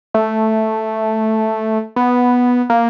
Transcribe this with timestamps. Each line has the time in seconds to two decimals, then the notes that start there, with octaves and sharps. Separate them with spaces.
0.14 A3
1.96 B3
2.70 A#3